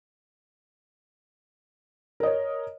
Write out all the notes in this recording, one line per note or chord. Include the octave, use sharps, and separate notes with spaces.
A#4 C#5 D#5